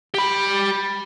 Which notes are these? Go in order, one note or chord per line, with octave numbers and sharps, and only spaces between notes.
G4 B5